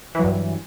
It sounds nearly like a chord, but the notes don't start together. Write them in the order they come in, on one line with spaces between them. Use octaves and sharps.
E3 F#3 G2